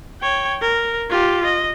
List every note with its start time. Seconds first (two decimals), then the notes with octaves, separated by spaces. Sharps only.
0.22 C#5 G5
0.61 A#4
1.10 F4 G4
1.45 D#5